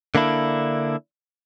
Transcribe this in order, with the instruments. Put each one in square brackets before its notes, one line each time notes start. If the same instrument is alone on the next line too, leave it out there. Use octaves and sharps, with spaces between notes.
[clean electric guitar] D3 A#3 D4 E4